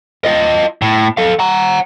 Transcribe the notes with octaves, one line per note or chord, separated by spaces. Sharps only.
F4 D#5
A2
A4 F5
F#5 A#5